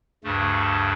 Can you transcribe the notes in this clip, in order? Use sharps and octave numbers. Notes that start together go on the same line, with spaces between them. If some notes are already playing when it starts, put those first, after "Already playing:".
D2 G2 C#3 A3